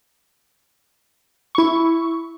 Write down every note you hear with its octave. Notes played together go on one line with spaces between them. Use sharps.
E4 C#6